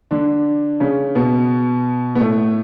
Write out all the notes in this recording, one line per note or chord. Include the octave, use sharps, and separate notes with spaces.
D3 D4
C#3 C#4
B2 B3
B3
A2 A3